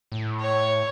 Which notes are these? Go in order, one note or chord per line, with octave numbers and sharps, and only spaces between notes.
A2
C#5